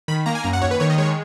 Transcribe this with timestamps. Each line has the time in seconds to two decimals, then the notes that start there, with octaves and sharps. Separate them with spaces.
0.08 D#3 B5
0.26 A#3 A#5
0.35 G#5
0.43 F#2 A#5
0.53 F#5
0.61 D#2 C#5
0.71 B4
0.80 D#3 C#5
0.90 D#5
0.98 G#3 C#5